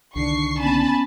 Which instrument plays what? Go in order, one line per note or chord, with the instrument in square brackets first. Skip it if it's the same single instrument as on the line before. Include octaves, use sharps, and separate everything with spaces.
[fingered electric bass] C2 D3 D#3 [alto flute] D4 [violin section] C#6 C7
[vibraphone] A#3 B3 C#4 [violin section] G#5 A5 B5